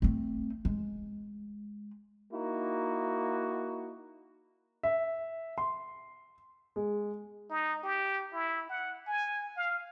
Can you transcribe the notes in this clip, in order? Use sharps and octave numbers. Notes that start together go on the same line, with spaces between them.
A3 C4
G#3
A#3 D#4 E4 F#4
E5
C6
G#3
D#4
G4
E4
F#5
G#5
F5